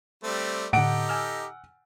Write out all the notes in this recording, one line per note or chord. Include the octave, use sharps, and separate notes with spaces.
G3 A3 C4
A2 D3 D#4 G4 A4 F#5 D7
G#5 E6 F6